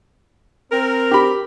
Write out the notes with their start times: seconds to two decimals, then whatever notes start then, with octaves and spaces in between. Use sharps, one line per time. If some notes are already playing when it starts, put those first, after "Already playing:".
0.71 C4 A#4
1.11 G4 B5